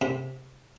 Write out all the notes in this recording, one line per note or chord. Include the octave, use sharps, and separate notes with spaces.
C3